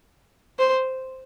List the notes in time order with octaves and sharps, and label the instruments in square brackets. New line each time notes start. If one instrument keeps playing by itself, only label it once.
[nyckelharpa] C5